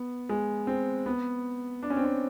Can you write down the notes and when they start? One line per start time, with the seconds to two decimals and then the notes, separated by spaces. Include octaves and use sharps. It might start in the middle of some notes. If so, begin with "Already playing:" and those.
Already playing: B3
0.29 G#3
0.67 C4
1.06 B3
1.83 D4
1.90 C#4
1.97 C4
2.04 C#4